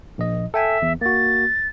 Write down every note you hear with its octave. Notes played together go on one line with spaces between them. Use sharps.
A#1 D#5
A4 E5 G5 G#5
E2
A#3 F#4 A6